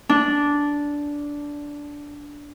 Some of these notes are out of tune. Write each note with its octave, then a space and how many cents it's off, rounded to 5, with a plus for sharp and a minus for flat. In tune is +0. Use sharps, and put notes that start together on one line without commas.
D4 -10